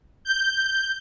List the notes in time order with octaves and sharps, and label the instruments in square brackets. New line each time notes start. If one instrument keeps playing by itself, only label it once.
[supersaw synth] G6